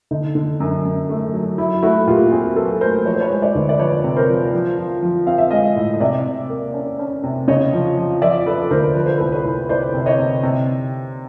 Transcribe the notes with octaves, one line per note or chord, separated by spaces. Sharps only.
D3 D#4
D3
F#2
F#2
A3
F#3
F#3 E4
A3 E4 F#4
A#2 F4 G4
C4 F#4 G#4
F#3 A4 B4
A3 A#4 C5
F3 C#5
C5
B4 C#5
G#3
C5 D5
D2
D5
F3 B4 C#5
C3
A#4 C5
F3
F3
F3
F3
C4 F5
E5
G#3 D#5 F5
A2
D#5
C3 D5 E5
C3
A#3
C#4
C#4
C3
C#3 C#5 D#5
F3
F3
F3 D5 E5
F3 A4 B4
D2 A#4 C5
F3 B4
C5
C2 A4 B4
B4 C#5
C2
C2 C5 D5
C3
C#5 D#5
C3
C3